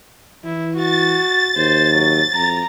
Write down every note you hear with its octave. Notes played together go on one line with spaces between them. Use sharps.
E3 E4
F#4 A6
D#2 C5
F#3
F2 A#5